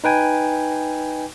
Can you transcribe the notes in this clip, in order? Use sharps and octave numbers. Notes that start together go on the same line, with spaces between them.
D#4 B4 G5 G#5